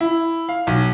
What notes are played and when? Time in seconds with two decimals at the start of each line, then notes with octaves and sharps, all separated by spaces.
0.01 E4
0.49 F5
0.67 B1